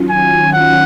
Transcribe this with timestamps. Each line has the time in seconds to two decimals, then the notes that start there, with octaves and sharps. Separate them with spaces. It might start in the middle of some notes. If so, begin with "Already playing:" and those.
Already playing: D#3 F#3 C#4 F4
0.10 G#5
0.53 F#5